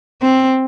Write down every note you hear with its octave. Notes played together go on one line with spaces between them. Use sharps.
C4